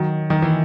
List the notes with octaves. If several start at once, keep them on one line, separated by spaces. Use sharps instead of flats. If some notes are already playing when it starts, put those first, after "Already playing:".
Already playing: D#3 F#3
D#3
E3